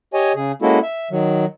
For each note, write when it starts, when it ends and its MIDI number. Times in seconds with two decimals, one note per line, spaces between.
0.14 0.32 67
0.14 0.32 73
0.14 0.32 75
0.14 0.32 80
0.35 0.52 49
0.35 0.52 68
0.62 0.79 56
0.62 0.79 58
0.62 0.79 61
0.62 0.79 64
0.62 0.79 66
0.62 0.79 69
0.83 1.09 76
1.11 1.45 51
1.11 1.45 54